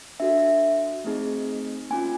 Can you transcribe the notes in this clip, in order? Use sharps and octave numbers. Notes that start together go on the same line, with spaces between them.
D4 F#4 A4 E5
A3 C4 D#4 G#4
A#3 C#4 F4 G#5